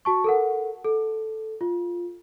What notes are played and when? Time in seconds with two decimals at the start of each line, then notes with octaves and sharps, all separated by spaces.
0.05 F#4 A5 C#6
0.24 A4 A#4 F#5
0.84 A4
1.61 F4